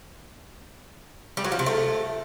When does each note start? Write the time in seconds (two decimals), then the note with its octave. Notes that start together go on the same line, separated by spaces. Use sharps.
1.37 G3
1.44 F#3
1.52 F3
1.59 C3
1.66 A3